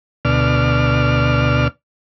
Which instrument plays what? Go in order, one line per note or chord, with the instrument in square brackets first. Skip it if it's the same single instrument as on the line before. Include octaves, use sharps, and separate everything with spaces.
[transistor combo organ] D2 B2 D5 F6